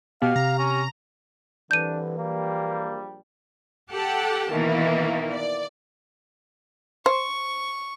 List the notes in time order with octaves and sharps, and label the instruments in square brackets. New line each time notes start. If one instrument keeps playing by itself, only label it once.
[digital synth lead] B2 [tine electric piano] G4 [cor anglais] F5
[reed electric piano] C3 [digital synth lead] A#5
[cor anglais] C#4
[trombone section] C2 G2 D3 [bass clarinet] E3 [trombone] D4 [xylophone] G6 D#7
[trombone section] A#1 G3 [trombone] A#3
[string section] G4 A4 F#5 G5 A5
B2 D#3 E3 A#3
D5
[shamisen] C5 [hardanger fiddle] C#6